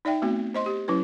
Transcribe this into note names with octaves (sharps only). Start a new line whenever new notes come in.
D#4 D5 E5 G5
A3 B3 C4 F#4
C5 D#5 C6
G4
F#3 C#4 E4 B4